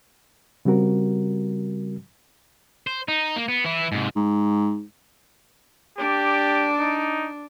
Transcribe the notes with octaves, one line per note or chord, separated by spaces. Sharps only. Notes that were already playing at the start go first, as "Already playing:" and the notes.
C#3 G3 C4 F#4 A#4
C5
D#4
A#3
B3
E3 E4
G#2 C3
G#2
D4 G4 D5
D#4